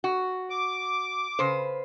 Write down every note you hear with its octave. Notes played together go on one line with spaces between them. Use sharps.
F#4
D6
C#3 B4 C5